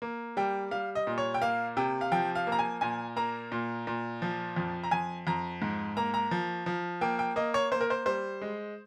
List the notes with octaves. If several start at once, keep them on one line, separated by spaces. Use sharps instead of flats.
A#3
G3 G5
G3 F5
D#5
A#2
C#5
G5
A#3 F5
C3 G5
F5
F3 G5
F5
A#3
A#5
G#5
A#2 G#5
A#3 A#5
A#2
A#2
F3
F2
A#5
F2 G#5
F2 A#5
G#2
A#3 A#5
A#5
F3
F3
A#3 G5
G5
A#3 D#5
C#5
A#3 C5
A#4
C5
G3 C5
G#3